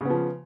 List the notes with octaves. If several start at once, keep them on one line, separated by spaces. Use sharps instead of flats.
C#3 F3 B3